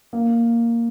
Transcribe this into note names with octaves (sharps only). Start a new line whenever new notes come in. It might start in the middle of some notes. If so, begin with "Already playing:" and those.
A#3